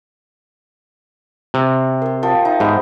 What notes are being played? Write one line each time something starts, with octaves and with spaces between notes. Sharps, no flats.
C3
G4 A#4
F3 A#4 G5
D#4 E5
G#2 B3 G4 C5